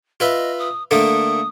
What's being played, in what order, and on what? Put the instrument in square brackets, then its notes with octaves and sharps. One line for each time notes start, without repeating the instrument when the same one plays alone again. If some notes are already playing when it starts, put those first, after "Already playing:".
[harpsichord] F4 B4 E5 [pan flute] D#5
[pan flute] D#6
[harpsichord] D3 A3 A#3 [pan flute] D#6